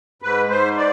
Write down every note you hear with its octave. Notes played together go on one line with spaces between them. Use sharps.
G#2 B4
G#2 C5
D5